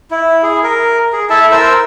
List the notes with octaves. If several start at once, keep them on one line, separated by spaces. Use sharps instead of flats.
E4
G#4
A#4
G#4
E4 A4 E5 A5
A#4 C5 E6